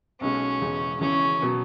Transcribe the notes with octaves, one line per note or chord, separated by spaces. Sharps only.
B1 B2 G#3 C#4
E1 E2 C#3 G#3
E1 E2 C#3 E3 C#4
B2 F#3